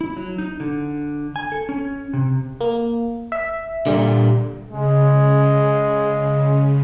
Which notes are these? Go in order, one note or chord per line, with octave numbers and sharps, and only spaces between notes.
E4
F#3
D#4
D3
G#5
A4
C#4
C3
A#3
E5
A#2 D3 G3
C#3 G#3